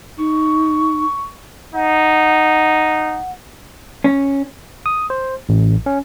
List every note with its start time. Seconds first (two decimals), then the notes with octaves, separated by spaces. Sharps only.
0.18 D#4 C#6
1.74 D#4 F#5
4.04 C#4
4.86 D#6
5.10 C5
5.49 A1
5.86 C#4